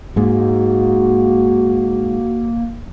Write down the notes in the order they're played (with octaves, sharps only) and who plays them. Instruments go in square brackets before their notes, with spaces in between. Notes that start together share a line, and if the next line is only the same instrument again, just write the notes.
[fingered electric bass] G#2 G#3 [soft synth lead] A#3 [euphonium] F#4